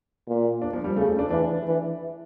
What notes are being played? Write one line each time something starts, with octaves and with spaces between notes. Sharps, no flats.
A#2
D4
F3
G3
C#3 A3
A3
D4
E3 D4
E3